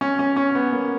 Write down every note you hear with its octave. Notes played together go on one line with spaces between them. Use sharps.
C#4
C#4
C#4
B3
A#3